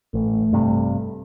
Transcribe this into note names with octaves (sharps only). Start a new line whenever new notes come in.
A1 A3
G2 C3